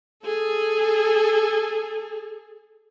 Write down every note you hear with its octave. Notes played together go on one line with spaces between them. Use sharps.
G#4 A4